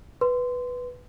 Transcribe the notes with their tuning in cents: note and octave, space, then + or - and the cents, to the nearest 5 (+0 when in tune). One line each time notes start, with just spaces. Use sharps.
B4 +0 C6 -15